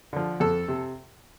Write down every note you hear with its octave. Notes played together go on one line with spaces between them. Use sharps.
D3 F3
F2 A4
C3